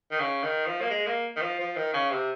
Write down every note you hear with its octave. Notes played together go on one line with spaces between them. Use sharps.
D#3
C#3
D#3
F3
A#3
G#3
A#3
D#3
F3
F3
D#3
C#3
C3